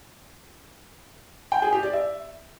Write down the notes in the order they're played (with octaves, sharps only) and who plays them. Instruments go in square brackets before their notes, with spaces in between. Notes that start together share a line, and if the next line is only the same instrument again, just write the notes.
[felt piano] G5
G#4
G4
D5
E5